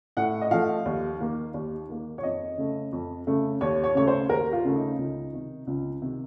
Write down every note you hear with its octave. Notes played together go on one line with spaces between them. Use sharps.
A2 F#5
D#5
F3 A3 F5
D#2
D#3 A#3
D#2
D#3 A#3
C#5
F2 D#5
C#3 A3
F2
C#3 A3
D#2 C#5
C#5
C#3 A3 C#5
C5
D#2 A#4
F4
C#3 A3
D#4
C#2
C3 D#3
C#2
C3 D#3